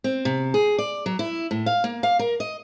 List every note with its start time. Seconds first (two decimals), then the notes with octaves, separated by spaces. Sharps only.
0.04 C4
0.25 C3
0.54 G#4
0.78 D5
1.06 F#3
1.19 E4
1.51 A2
1.66 F5
1.84 A#3
2.03 F5
2.19 A#4
2.40 D#5